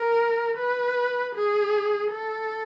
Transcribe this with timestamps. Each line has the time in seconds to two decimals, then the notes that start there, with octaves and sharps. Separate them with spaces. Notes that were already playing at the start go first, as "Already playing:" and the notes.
Already playing: A#4
0.57 B4
1.35 G#4
2.11 A4